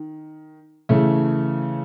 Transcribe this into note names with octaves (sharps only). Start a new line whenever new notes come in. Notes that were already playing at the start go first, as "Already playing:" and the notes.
Already playing: D#3
C#3 E3 A3